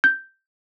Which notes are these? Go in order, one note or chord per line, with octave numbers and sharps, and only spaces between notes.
G6